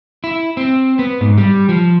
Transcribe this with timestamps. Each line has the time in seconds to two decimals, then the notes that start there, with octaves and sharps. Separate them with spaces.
0.24 E4
0.57 C4
0.99 B3
1.21 G#2
1.37 G3
1.69 F3